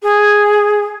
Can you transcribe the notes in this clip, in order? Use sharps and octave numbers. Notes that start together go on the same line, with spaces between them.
G#4